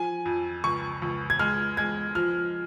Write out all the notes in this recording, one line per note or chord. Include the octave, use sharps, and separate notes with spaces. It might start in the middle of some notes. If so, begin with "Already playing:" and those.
Already playing: F3 G#5
F2
C#2 C#6
C#2
G#6
G#3 F6
G#3 G#6
F3 F6